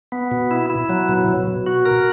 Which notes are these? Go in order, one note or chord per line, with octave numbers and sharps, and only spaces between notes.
B3
B2
E4
E4
F#3
B2
B2
B2
F#4
A#4